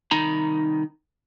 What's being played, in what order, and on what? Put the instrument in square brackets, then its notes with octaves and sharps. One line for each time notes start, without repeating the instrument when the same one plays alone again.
[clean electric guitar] C2 D#3 D#4 A#5 B5